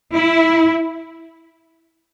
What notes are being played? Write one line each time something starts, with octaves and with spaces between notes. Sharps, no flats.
E4